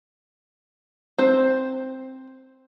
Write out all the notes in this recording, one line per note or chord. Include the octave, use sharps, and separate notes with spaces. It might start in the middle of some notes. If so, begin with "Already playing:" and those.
C4 C5